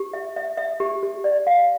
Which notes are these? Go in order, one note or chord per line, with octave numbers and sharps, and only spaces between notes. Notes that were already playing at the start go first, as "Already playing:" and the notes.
Already playing: G4
E5
E5
E5
G4
G4
D5
F5